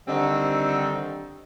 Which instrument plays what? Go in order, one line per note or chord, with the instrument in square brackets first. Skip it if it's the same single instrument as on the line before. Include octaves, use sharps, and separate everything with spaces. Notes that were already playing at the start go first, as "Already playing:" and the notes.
[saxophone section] D3 D#3 G3 C4 D#4